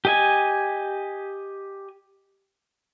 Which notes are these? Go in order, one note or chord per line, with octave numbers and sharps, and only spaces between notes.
G4 D#5 G#5